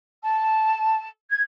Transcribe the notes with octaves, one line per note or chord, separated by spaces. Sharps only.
A5
G#6